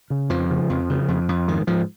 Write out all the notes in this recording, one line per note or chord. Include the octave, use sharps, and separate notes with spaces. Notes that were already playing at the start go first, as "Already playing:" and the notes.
C#3
F2 F3
C#3
F2
C#3
F2
F2
G#2 D#3
G#2 F3